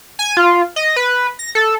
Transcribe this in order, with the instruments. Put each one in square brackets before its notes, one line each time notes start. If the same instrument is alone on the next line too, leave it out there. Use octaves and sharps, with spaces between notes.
[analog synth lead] G#5
F4
D#5
B4
A#6
A4